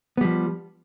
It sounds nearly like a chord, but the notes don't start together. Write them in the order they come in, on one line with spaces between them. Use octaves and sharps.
B3 G3 F3